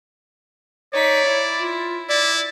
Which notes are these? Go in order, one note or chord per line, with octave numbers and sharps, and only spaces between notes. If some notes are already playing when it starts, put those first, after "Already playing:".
D#4 C#5 D5 B6
E4
F4
E4 D5 A6